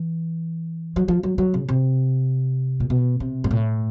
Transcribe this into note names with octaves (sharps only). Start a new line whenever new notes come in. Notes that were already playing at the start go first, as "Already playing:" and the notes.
Already playing: E3
F#3
F3
F#3
F#3
C#3
C3
A#2
B2
C3
G#2
A2